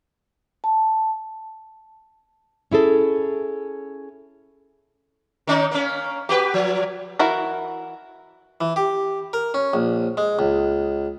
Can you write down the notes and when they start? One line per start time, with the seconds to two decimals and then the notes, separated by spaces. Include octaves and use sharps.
0.64 A5
2.71 C#4 E4 G#4 A4
5.47 D#3 C#4 D#4
5.71 A#3 C#4
6.29 F#4 G4 B4
6.54 F3
7.19 E3 E4 F#4 A#4
8.61 E3
8.76 G4
9.33 A#4
9.54 C#4
9.73 A#1
10.17 G#3
10.39 C#2